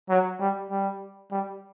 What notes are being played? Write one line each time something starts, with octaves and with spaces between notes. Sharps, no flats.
F#3
G3
G3
G3